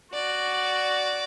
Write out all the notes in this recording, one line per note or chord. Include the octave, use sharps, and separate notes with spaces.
F#4 D5